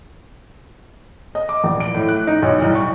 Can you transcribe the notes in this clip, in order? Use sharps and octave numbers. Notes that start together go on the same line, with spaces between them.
D#5
D6
A#1
D7
A2
F#6
D#4
B1
C2
C#6